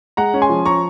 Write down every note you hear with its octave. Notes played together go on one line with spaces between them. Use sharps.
G#3 F#5 A#5
C#4
G#5 C6
F3
C#4 A#5 C#6